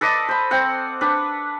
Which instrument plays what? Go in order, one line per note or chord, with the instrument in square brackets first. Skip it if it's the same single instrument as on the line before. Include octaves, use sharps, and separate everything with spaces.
[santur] A4 B4 D5 D#5
C5 B5
C4 F#5
D4 B4